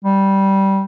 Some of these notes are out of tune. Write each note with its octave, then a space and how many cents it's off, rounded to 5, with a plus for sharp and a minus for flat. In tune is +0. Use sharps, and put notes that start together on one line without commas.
G3 -10